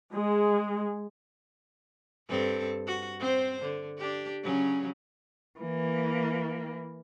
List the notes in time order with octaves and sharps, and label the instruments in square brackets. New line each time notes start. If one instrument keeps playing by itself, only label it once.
[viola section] G#3
[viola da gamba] G2 C4 A4
F#4
C4 C5
D3
D4 G4
C#3 F#3 C#4
[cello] E3 A#3